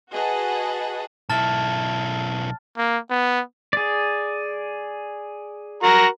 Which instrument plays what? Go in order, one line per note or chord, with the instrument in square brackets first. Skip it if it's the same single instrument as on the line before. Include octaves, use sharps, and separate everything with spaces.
[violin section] F#4 G#4 B4 D#5 F#5 A5
[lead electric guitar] B1 E4 [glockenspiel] A5 F6 A6
[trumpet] A#3
B3
[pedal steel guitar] G#4 D5
[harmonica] F#4 A#4 A#5